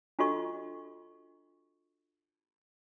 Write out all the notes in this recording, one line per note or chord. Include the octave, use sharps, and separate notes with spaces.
D4 F4 F#4 A4 D#5 C#6